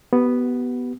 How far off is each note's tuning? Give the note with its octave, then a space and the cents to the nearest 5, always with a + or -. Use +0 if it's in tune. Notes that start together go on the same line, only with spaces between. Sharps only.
B3 +0 G4 -35